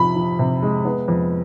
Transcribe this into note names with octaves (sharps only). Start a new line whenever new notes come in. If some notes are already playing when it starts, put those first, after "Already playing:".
Already playing: F2 C3 F3 B5
F3
C3
G#3
B3
F2